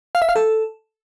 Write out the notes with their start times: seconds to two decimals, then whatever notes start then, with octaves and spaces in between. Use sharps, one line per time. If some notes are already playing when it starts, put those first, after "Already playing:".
0.15 F5
0.22 E5
0.29 F5
0.36 A4